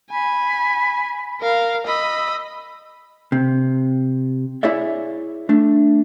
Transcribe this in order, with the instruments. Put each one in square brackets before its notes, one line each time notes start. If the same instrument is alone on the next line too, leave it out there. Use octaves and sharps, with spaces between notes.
[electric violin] G#5 [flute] B5
[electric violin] A#4 F5
[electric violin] D#5 B5 [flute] E6
[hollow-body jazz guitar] C3
E4 G#4 C#5 D5 E5
A3 D4